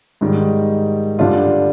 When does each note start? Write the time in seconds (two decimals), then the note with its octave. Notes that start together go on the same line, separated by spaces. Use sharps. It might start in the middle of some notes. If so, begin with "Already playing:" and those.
0.21 G#2 D#3 G3
1.19 G2 D3 G3 D4 F4